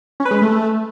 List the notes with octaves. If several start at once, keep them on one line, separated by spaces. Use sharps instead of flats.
C#4
B4
G#3
B4
A3